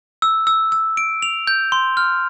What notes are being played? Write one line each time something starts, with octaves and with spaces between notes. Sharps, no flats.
E6
E6
E6
D7
F7
G6
C6
F6